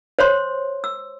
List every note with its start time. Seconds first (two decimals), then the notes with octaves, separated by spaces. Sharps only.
0.19 C5 C#5 C6
0.84 E6